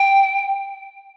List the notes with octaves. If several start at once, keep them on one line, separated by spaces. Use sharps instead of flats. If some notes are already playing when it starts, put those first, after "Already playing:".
Already playing: G5